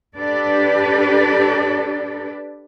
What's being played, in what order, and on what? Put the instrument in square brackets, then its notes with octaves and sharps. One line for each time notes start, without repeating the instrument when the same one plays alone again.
[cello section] D4 G4 A4 B4 D5